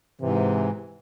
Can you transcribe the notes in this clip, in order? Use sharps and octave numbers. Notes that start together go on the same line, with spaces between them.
G#2 C3 E3